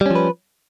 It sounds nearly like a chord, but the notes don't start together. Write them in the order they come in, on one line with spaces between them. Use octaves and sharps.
G3 C#4 F3 B4